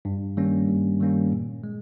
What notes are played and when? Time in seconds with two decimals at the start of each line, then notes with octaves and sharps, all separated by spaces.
0.05 G2
0.37 D#3 G3 A#3 C#4
0.68 G2
1.00 D#3 G3 A#3 C#4
1.32 A#2
1.64 G#3